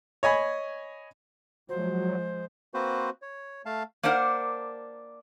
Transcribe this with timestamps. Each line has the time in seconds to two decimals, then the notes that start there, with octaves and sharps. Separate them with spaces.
0.23 C#5 D#5 G#5 B5
1.69 F3 F#3 G#3 C5
2.74 A#3 C4 F#4 B4 C5
3.22 C#5
3.66 A3 F5 A5
4.03 A#3 D4 A#4 C5 F#5